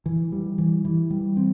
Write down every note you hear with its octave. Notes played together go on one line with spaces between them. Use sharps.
E3
G3
E3
E3
G3
C4